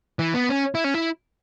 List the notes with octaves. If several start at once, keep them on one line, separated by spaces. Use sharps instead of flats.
E3
B3
C#4
E4
C#4
E4